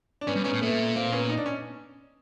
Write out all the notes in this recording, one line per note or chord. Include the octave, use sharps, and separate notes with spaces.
D4
G#2 B3 C#4
G2
G#2 B3 C#4
A2
A#2 A3 B3
A#3 C4
B3 C#4
D#4
D4
C#4